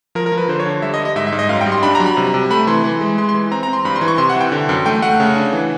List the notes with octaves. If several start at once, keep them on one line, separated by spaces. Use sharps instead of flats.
F3 A#4
A#4
F3
B4
D3 C5
C#5
D3
G3 E5
D#5
G3
D#5
G#2 E5
E5
G#2
D#5
F#2 F5
G5
G3
C6
D4 B5
A#5
F#3
B5
C3
C3
A3 B5
E3 C6
E3
G#3
G#3 C6
C6
E3
C4 A#5
A#5
C4
C6
G2 B5
C6
E3
C#6
C3 C6
F#5
E3
G5
D3
F#2
A3 G5
A3 F#5
C#3
D4
E3